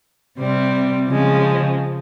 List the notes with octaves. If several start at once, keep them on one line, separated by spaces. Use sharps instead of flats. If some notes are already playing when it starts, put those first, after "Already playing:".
C3 G3 C4
C#3 F3 G#3